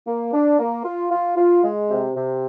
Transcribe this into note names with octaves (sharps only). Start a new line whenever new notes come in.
A#3
D4
A#3
F4
F4
F4
G#3
C3
C3